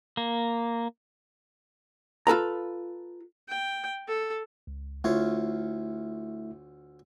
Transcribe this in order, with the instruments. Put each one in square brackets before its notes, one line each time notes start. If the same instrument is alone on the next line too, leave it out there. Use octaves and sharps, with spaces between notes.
[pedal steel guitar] A#3
[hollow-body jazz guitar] F4 A4 B4 A#5
[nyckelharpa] G5
A4
[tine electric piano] C#2
[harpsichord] D2 F4 C#5 [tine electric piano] A3 E4 E5